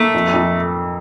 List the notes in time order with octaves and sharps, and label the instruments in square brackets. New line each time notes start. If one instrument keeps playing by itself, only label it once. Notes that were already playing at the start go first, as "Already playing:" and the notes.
Already playing: [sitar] A3 [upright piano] A#3
[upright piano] F2
F2